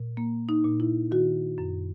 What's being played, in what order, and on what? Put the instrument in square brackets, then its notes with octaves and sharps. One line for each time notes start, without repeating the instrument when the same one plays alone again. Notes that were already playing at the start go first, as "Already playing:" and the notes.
Already playing: [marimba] A#2
A#3
D#4
A#2
E4
D#3 F#4
F#2